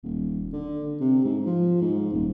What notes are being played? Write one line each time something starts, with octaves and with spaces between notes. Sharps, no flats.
D#1
D3
C3
G#2
F3
G#2
D#1